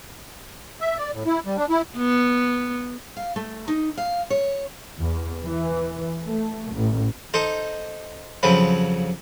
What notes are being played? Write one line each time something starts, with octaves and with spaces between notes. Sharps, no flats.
E5
D5
A2
E4
G3
D4
E4
B3
F5
A3
D#4
F5
C#5
E2
E3
A3
A1
D#4 A4 C5
F2 C#3 F3 F#3 B4